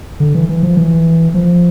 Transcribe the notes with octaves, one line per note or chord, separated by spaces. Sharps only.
D3
E3
E3
F3
E3
F3